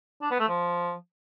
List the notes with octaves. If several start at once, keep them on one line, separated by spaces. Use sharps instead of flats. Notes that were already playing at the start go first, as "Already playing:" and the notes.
D4
B3
A3
F3